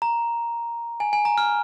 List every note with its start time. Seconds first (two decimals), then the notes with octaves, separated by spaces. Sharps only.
0.02 A#5
1.00 G#5
1.13 G#5
1.25 A#5
1.38 F6